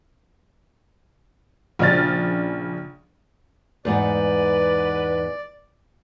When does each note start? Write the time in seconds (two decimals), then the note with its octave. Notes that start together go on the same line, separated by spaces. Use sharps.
1.79 A#1 C#3 D4 F6 A6
3.85 E2 G#2 B3 B4 D5